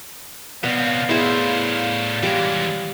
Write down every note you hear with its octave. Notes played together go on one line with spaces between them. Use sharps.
B2 B3 C4 C#5 D5 F5
A2 B3 E4 G#4 C5
E3 G3 G#3 D6